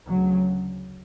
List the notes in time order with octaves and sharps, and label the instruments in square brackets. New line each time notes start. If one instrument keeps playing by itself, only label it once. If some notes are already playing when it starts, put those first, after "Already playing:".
[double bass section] D2 C#3 F#3